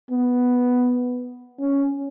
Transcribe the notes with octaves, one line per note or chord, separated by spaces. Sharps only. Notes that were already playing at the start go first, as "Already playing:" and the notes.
B3
C#4